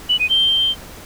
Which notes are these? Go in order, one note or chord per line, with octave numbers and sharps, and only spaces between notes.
F#7
D#7
G7